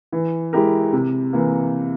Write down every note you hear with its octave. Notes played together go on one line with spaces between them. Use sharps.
E3
G#3 E4 G4 A#4
C3
E3 A#3